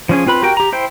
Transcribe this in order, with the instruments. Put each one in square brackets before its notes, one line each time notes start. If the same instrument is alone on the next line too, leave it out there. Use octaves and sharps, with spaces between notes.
[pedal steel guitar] F3 C#4 G#4
C4 F4 B4 B5
F#4 G4 A#4 G5
G4 A#5
E4 C5 G5